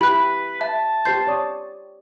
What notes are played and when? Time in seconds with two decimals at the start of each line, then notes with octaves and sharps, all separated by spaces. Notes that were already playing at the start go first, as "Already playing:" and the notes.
0.01 E4 G4 B4 B5 F#6
0.61 E5 A5
1.05 G4 C5 C6 G6 C7
1.27 C#5 D5 D#6